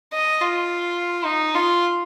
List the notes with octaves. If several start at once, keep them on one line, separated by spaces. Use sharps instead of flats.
D#5
F4
D#4
F4